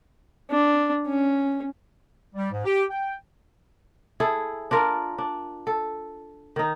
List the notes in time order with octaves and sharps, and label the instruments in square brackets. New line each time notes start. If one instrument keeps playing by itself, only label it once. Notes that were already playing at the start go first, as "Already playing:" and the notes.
[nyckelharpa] D4
C#4
[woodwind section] G3
G#2
G4
G5
[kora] E4 G#4 A4
D4 F4 A#4
D4
A4
D#3 D#4